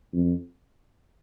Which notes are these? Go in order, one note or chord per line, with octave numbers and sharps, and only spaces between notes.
F2